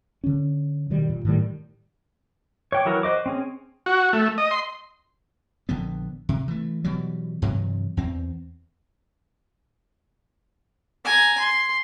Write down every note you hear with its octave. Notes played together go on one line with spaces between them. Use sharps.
D3 C#4
B2 D#3 G3
A#2
A2 D#3 G3
C#5 G5 D6
E3 F#3 E4 A#4 C#5
F#4 C5 D#5 D6
C4 C#4 G#4
F#4
A3
D#5
C6
A#1 D3 B3
C3
E3 A3
B2 E3 F#3 G3
G2 C3 E3 F#3
E2 C4
G#5 A#5
C6